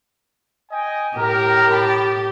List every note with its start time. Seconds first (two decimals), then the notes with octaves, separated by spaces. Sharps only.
0.71 D#5 G5 G#5
1.18 A2 G4 A#4
1.71 A5 B5